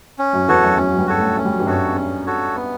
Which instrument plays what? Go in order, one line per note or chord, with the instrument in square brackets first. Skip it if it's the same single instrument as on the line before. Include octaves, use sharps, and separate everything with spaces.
[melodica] C#4
[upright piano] F#2 F#3
[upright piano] E2 E3 [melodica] F#4 A4 C#5
[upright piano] F#2 F#3
[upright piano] F#2 F#3 [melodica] C#4
[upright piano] F#3
G2 G3
[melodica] F#4 A4 C#5
[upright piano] A2 A3
[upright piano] A3 [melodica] C#4
[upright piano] G3
F#3
G2 G3
[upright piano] F#2 F#3 [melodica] F#4 A4 C#5
[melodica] C#4
F#4 A4 C#5
B3